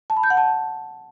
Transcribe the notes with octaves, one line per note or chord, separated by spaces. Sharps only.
A5
B5
G6
F#5
A5